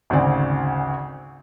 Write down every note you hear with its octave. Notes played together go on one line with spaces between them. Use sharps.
G#1 D2 C#3 C4 D5